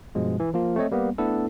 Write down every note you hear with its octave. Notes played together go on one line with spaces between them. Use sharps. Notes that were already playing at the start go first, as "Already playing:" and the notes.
G2 B2 F3 G#3
E3
F3 A#3 F4
A3 C4 C#5 D#5
G3 A#3 B3
A3 B3 D4 E4 A4